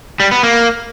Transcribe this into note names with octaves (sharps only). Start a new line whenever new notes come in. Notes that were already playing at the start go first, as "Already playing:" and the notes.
G3
B3
A#3